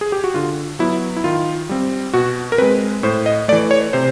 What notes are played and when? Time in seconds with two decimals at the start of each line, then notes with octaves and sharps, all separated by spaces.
0.01 G#4
0.12 G4
0.24 F#4
0.34 D3 F4
0.79 F#3 B3 E4
1.16 E4
1.24 D#3 F4
1.69 G3 C4
2.14 B2 F#4
2.52 A#4
2.58 G#3 C4 B4
3.03 A2 C5
3.26 D#5
3.48 A3 D5
3.52 E3
3.71 C#5
3.93 C3 C5